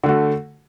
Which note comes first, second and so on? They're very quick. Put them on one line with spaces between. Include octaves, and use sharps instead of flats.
D3 A3 F#4